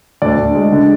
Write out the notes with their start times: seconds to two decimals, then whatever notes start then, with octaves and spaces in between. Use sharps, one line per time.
0.22 D2 D5
0.39 D2
0.55 G#3
0.72 D3